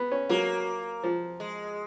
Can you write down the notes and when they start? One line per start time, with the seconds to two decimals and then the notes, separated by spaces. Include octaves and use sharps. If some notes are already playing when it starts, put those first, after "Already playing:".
Already playing: B3
0.12 C#4
0.29 F#3 A#3
1.03 F3
1.40 G#3